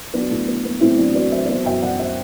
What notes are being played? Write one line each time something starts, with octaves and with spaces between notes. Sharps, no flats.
F#3 B3 D4
A2
B3
B3
A2 C4 E4
F#3 D4 F#4
F#3 B4 D5
F#3 C5 E5
D5
B3 C5 E5
F#2 E5 G5
F#2 D5 F#5
C5 E5